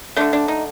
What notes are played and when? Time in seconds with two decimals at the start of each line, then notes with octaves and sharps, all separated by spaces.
0.16 D3 A3 D4
0.33 D4
0.48 D#4